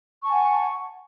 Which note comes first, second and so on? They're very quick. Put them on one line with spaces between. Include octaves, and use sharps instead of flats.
C#6 A5 G#5 F#5